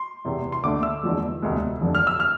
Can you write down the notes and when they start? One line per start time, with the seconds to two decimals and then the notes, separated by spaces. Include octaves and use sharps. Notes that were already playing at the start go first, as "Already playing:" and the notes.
Already playing: C6
0.25 E1 E2 C3
0.52 C6
0.63 D2 D3 A3 D6
0.83 E6
1.03 E2 D3 F3 G#3
1.42 E1 D2 C3 G#3
1.81 F1 F2 D3
1.95 F6
2.07 E6
2.20 F6